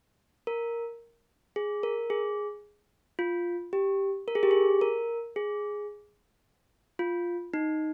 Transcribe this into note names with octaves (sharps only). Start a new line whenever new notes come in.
A#4
G#4
A#4
G#4
F4
G4
A#4
G#4
G4
G#4
A#4
G#4
F4
D#4